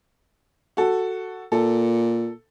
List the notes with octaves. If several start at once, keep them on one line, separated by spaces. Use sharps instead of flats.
F#4 A4
A#2 A4